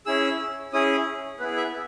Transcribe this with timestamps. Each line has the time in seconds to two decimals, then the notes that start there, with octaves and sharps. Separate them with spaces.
0.06 C#4 E4 G#4 E6
0.73 C#4 E4 G#4 D#6
1.40 B3 E4 G#4 B4
1.57 E5